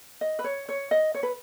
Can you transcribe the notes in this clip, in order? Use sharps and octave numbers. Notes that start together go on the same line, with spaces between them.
D#5
B4
C#5
C#5
D#5
C#5
B4